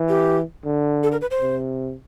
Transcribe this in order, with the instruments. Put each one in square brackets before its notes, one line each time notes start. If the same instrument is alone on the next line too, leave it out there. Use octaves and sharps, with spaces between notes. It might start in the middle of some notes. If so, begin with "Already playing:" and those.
Already playing: [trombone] E3
[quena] G4
[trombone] D3
[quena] A4
A#4
B4
C5
[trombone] C3